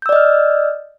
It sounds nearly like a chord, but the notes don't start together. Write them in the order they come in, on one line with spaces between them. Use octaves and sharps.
G6 E6 D5 D#5 F6